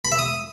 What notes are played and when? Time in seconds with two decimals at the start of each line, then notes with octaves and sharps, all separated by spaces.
0.05 B5
0.12 E5
0.19 D#6